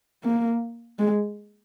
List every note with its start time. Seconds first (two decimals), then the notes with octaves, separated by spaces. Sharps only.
0.24 A#3
0.99 G#3